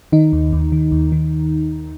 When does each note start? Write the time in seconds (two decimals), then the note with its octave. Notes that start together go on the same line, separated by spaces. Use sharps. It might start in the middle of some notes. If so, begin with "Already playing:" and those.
0.12 D#3 D#4
0.33 D#2
0.53 D#2
0.72 D#3
0.92 D#2
1.12 D#3